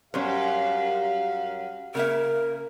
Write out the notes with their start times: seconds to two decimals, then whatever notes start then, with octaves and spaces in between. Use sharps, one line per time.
0.14 F#2 G3 C#4 G4 C5 F5
1.95 C#3 A#3 A#4 E5